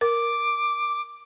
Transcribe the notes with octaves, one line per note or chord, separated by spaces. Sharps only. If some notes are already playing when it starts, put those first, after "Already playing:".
A#4 D6